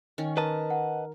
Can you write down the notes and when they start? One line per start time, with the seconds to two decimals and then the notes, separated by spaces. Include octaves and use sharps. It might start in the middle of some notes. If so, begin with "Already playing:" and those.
0.18 D#3 C#4
0.37 A#4 B4 D#5 A5
0.70 F#5